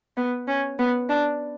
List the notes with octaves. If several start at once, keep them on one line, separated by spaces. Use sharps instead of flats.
B3
C#4
B3
D4